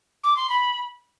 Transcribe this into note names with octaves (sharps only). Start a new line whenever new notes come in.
D6
C6
B5